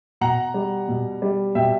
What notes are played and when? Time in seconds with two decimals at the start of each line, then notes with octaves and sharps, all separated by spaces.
0.21 B2 F#5 A#5
0.54 G3
0.88 B2
1.22 G3
1.55 B2 E5 G5